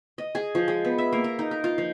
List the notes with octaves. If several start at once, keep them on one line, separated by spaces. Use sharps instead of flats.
D#5
G#4
F3
G#3
B3
E5
A#3
A#4
D#4
A#4
F4
F3